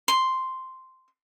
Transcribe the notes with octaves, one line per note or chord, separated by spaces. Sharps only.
C6